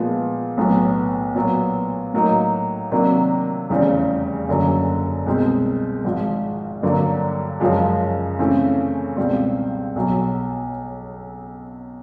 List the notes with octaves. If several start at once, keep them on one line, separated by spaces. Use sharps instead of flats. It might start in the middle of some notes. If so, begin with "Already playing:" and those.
Already playing: A#2 F3 G#3 B3
B1 A2 F#3 B3
A#2 F#3 B3
A2 F#3 A#3 D#4
C3 D#3 F#3 A#3 D4
F1 E2 C#3 E3 G3
F#1 F#2 D3 F#3
C2 B2 G#3 C4
G#1 G#2 F3
G2 D3 F#3 A#3
F#2 C#3 F3 G#3
C#3 E3 A3 C4
C#2 B2 G3 C4
B1 B2 F#3